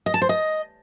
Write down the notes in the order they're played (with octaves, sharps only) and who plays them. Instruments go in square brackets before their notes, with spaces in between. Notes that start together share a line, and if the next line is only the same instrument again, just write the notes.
[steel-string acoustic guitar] D#5
A5
C5
D#5